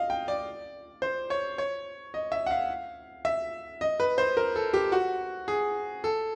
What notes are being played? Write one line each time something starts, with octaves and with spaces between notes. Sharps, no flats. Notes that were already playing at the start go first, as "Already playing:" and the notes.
Already playing: D#5 F5
G5
D5
C5
C#5
C#5
D#5
E5
F#5
F5
E5
D#5
B4
C5
A#4
A4
G4
F#4
G#4
A4